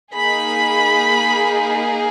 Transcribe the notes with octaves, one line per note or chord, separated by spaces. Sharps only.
A#3 D#4 G#4 B5